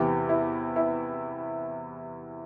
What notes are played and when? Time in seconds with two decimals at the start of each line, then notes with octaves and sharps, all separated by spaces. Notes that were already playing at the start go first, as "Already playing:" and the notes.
Already playing: E2 C3 E3 E4 G4
0.29 E4
0.76 E4